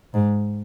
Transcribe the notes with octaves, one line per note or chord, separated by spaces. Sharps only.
G#2